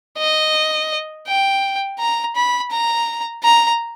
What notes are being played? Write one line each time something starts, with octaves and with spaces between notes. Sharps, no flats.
D#5
G5
A#5
B5
A#5
A#5